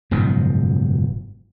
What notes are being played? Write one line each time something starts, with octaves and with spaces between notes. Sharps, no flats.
F#1 G#2 B2 F3